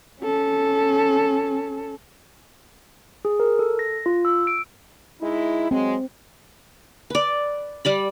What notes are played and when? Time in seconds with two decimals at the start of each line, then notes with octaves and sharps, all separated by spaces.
0.21 C#4 A4
3.25 G#4
3.40 A#4
3.59 A4
3.79 A#6
4.06 F4
4.25 E6
4.47 D7
5.21 G#3 D#4 E4
5.71 F#3 G#3 C4
7.10 B4 D5
7.85 G3 D5 B5